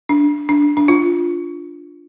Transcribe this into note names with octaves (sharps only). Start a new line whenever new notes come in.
D4
D4
D4
F4